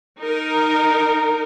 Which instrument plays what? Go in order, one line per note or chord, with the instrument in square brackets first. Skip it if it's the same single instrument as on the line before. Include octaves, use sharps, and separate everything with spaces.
[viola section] D#4 A#4